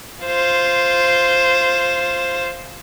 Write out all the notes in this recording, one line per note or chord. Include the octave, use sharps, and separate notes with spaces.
F4 C5